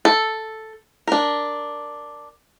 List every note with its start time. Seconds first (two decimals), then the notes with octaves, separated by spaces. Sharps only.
0.05 A4
1.07 D4 A#4